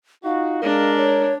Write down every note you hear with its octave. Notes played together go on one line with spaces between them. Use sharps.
D#4 F4 F#4 F5
G#3 D4 A#4
C#5